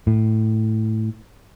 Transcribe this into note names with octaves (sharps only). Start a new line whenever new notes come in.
A2